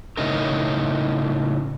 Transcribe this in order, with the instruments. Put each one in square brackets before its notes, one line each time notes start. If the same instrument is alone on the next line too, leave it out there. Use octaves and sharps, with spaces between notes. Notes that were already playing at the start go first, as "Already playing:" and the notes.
[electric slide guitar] A2 C#3 D#4 A#4